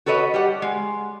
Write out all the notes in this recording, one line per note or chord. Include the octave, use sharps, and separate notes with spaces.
F#4 A4 B4 C#5 D#5
G3 G4 F#5
G#3